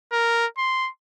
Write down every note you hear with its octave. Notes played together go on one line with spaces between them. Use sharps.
A#4
C6